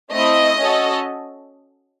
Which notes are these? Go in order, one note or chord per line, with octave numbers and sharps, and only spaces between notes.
A3 C4 E4 D#5
C#4 F#4 A4